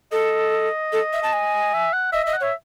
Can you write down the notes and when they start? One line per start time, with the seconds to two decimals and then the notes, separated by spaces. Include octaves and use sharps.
0.12 A4 D#5
0.93 A4
1.13 E5
1.23 A5
1.33 G#5
1.74 E5
1.93 F#5
2.13 D#5 E5
2.23 D#5 E5
2.33 F#5
2.41 C#5 E5